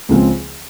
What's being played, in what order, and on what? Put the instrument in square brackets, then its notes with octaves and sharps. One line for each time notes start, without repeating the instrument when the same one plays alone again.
[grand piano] C#2 C#3 F3 G#3 C4